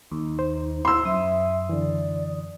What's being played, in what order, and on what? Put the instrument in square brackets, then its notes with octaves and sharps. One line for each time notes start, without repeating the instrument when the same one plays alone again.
[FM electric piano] D#2 [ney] D#4
[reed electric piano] C5
[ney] E4 [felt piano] C6 E6
[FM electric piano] F#2 D#6 [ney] E5
[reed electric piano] D3 E3 [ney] D5